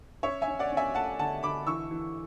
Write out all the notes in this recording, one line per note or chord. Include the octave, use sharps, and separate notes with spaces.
C#4 C#5 E5
E5 G#5
C#4
D5 F#5
C#4
E5 G#5
A3 F#5 A5
D3 F#5 A5
D3 B5 D6
E3 C#6 E6
E3